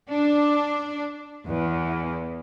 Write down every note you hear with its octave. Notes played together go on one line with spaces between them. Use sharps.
D4
E2